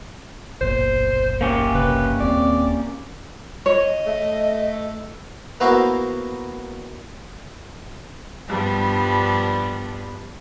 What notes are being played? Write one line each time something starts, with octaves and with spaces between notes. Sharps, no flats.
F#1 B1 A#2 C5
A#3 C#4 G4
F#1 C2 C#3 B4
D#1 C4 D5
C#5 D#5
A3
A#3 B3 E4 F#4 A#4 C5
G2 F3 G3 B3 D4